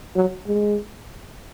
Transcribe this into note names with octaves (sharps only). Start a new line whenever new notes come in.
F#3
G#3